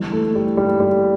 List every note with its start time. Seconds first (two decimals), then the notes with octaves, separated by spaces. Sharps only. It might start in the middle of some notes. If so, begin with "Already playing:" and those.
Already playing: G1 G2 E3
0.12 A3
0.35 G3
0.57 G3
0.80 G3